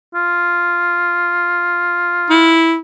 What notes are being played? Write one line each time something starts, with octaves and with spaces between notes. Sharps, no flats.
F4
E4